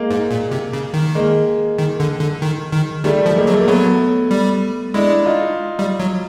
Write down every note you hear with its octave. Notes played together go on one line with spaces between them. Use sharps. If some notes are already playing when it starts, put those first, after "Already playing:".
Already playing: G#3 A#3
G#2
A#2
C3
C#3
D#3
G#3 A#3
D#3
D3
D3
D#3
D#3
D#3 G3 A3
F3
G#3 A#3
F#3
A3
A#3
F#3 A3 B3
G3
G#3 D4 E4
D#4 F4
G3
F#3